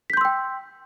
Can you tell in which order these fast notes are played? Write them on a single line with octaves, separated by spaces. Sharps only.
B6 G6 C6 E6 G5